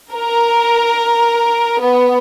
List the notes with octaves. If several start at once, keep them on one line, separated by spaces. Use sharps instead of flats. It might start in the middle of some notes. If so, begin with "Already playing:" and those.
A#4
B3